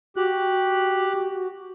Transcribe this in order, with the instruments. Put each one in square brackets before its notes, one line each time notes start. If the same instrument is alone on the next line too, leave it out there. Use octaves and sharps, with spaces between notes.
[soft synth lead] F#4 [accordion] G4 F#6